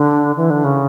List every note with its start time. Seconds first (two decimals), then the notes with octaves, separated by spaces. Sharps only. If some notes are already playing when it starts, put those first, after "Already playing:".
Already playing: D3
0.37 E3
0.50 D3
0.64 C#3